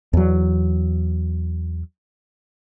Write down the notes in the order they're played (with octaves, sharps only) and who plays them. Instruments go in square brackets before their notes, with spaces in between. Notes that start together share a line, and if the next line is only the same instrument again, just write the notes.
[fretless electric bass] E2 F#3